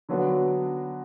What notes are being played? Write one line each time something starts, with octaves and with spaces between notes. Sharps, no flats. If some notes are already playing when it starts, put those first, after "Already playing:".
D3 F#3 B3 D4 F#4